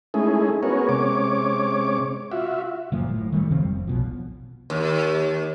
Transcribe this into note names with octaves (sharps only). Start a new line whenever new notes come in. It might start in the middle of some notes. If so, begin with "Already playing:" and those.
G#3 A3 C#4 D#4 E4 G#4
B3 C#4 F#4 G#4 A#4 C#5
C3 G#3 C#4 C#5 D6
F4 F#4 E5
F#1 A#2 F3
A2
D#3 G3 A3
C3 F3 G3 C4
F1
B1 B2 F3
D#2